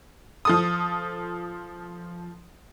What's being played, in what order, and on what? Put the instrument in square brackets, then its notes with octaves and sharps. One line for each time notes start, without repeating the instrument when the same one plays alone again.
[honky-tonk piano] F3 A4 D#6